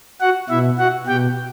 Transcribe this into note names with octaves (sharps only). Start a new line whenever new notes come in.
F#4 F#5
B2 E4 E5
F#4 F#5
B2 G4 G5